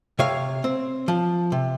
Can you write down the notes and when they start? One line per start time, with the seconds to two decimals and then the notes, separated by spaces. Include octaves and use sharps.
0.19 C3 C#5 F5
0.64 C4
1.08 F3
1.52 C3